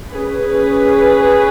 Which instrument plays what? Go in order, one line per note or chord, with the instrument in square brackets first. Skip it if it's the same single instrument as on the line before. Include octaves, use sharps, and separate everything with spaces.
[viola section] C#4 G#4 B4